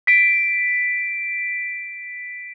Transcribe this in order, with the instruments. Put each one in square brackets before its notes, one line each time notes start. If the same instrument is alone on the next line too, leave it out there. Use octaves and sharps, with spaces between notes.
[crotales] B6 D7